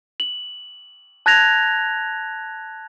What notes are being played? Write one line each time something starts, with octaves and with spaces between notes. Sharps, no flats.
F#7
A5 F#6 G#6 A#6 F7